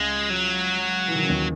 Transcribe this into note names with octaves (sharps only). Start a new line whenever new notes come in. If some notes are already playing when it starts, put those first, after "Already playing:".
Already playing: C#2 C#3 G#3
F#3
E3
D#3
C#3
D#2 D#3